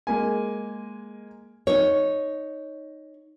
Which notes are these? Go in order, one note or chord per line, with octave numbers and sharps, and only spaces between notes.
G#3 A#3 G#5
D#4 C#5